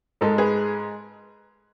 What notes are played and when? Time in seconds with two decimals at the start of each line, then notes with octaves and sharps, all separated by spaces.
0.21 G#2 G#3 A4
0.38 G#4 B4